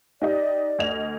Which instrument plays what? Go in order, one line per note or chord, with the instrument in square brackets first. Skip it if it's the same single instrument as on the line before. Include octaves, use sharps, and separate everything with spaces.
[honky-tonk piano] D#4 G4 D#5 [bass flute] D5
[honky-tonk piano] D2 D#5 F7